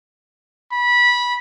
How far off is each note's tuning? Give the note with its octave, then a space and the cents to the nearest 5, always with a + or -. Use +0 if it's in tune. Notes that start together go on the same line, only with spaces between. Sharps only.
B5 -20